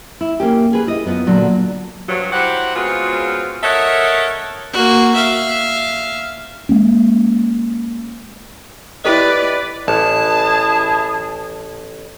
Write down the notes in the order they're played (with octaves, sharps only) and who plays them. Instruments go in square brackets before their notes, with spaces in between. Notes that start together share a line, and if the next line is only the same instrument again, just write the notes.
[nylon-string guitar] E4
A#3 C#4 G4
G#4 B4
E4 D#5
F#2 B3 F4
A#2 D3 F#3
[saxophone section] G2 F3 F#3
F#3 E4 G4 C5 F#5
C#3 G#3 B3 C4 F4 F#4
A4 A#4 C#5 D#5 E5 F#5
[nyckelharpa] A#3 F#4
E5 F5
[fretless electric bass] G#3 A#3 C#4
[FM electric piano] E4 G4 D#5 [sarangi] B4 [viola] D5
[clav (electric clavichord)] A1 [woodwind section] E4 G#4 [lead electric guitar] A5